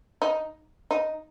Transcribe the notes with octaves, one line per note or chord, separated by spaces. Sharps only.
D#4
D#4